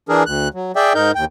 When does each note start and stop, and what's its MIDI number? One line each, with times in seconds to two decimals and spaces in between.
0.09 0.23 52
0.09 0.23 62
0.09 0.23 68
0.09 0.23 70
0.26 0.48 38
0.26 0.48 90
0.54 0.72 54
0.76 0.93 68
0.76 0.93 74
0.76 0.93 76
0.76 0.93 79
0.95 1.11 44
0.95 1.11 63
0.95 1.11 70
0.95 1.11 91
1.15 1.25 39
1.15 1.25 79